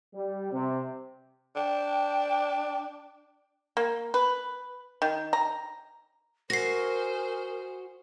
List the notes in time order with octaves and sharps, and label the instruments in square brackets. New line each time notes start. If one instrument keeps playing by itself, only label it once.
[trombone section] G3
C3
[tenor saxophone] D4 [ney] G5
[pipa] A#3
B4
D#3
A#5
[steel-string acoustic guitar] F#4 [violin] G#4 C5 [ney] A#4 [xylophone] A#6 C7